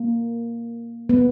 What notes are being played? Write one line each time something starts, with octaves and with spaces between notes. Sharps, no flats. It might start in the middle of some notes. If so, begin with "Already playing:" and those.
Already playing: A#3
B3